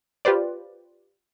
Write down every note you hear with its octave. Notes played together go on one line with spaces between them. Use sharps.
F4 G4 B4 C5 D5